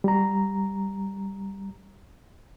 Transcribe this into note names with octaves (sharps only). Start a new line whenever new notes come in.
G3 A#5